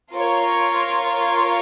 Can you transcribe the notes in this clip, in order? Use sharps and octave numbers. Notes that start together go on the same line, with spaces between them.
F4 A#4 C#5